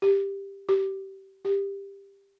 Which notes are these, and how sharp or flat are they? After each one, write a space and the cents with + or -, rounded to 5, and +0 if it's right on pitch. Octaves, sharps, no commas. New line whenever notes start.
G4 +10
G4 -20
G4 +15